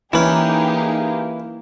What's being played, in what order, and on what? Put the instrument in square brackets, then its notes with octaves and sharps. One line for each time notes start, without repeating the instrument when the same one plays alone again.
[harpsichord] E3 C#4 [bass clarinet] A#3 [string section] D#4 G4 G#4 [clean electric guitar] E4 B4